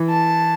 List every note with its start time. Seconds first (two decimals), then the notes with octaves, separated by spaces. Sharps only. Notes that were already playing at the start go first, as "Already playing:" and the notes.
Already playing: E3
0.10 A5